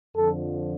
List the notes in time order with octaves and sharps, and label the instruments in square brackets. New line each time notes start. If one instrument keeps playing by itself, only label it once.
[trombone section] F2 D3 F3 A4